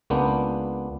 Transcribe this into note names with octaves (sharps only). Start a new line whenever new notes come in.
C#2 A#3 B3 D4 G5